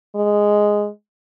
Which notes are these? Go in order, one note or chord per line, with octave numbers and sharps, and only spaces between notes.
G#3